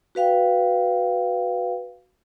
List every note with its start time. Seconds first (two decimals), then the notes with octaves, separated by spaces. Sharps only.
0.15 F#4 B4 F5 G5